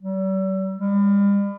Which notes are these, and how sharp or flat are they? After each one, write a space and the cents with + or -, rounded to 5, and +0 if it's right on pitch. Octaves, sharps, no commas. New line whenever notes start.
G3 -45
G3 +40